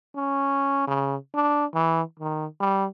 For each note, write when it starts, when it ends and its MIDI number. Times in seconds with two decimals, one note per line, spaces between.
0.15 0.87 61
0.87 1.16 49
1.34 1.65 62
1.74 2.02 52
2.19 2.46 51
2.60 2.86 55